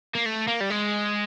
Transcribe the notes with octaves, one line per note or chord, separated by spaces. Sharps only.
A#3
A3
A#3
G3
G#3